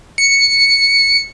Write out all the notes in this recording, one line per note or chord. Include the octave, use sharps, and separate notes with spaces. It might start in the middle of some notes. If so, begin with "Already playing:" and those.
C#7